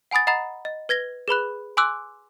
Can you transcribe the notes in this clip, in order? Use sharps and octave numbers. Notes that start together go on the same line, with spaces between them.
F#5 G#5 B5 D#6 A6
D#5 F#5 A#5 B5 D#6 A6
D#5
B4 G#6 A#6 G7
G#4 B4 B5 F#6
G#5 C6 D6 E6 F#6